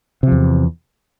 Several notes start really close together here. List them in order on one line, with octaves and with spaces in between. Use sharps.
C3 F3 E2